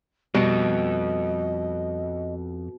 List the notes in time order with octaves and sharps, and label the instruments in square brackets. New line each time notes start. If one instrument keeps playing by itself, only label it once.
[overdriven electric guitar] F2 [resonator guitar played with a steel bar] B2 [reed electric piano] G3 [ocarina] D#5